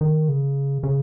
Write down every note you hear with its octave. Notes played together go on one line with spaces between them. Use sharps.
D#3
C#3
C#3